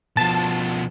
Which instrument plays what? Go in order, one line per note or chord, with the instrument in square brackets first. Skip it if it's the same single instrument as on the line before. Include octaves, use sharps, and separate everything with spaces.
[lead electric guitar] B2 F3 [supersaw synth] A5